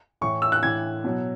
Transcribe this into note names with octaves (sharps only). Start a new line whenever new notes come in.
A2 E3 C#6
E6
F#6
A2 E3 G#6
B2 F#3